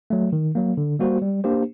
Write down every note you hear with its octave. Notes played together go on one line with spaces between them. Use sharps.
F#3 A3
D#3
F#3 A#3
D3
G3 A#3 F#4 C5
G3
A#3 D4 G4 C5